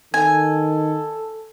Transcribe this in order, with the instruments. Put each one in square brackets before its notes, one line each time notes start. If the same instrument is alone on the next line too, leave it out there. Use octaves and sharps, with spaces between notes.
[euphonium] D#3 [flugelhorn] A4 [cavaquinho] G#5